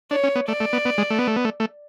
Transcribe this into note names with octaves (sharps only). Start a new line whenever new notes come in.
D4 C#5
C#4
B3
A3 D5
A3
B3
B3
G#3
A3
B3
A3
B3
A3
A3